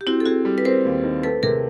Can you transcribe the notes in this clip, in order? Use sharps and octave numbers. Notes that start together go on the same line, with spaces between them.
G4
C4 E4 F#4
A4
C4 F#4 G#4
G3
B4
C4 A#4 C5
D#2
D#3
A3 A4 B4
C3 G#4 A#4